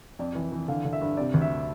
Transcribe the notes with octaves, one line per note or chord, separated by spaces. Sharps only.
F2 D5
E3
E3
D3 F5
D3
E5
G2
C3 D5
D2
E5